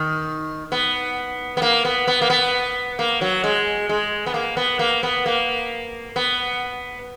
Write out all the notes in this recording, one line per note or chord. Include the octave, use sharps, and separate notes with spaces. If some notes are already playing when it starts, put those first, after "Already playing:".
Already playing: D#3
B3
B3
A#3
B3
B3
A#3
B3
A#3
F#3
G#3
G#3
B3
A#3
B3
A#3
B3
A#3
B3